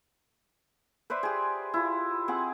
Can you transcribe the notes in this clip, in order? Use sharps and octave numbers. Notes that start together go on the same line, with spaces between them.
B4 C5 D5 E5
G4 G#4
E4 F4
C4 G#4 F#5